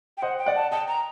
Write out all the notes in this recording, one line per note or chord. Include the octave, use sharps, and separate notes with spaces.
G5
C5 D#5 F#5
G5
D5 F#5
A5
D#5 G5 A5
A#5